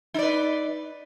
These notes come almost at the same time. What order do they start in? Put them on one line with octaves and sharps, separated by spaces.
D#4 D5 B4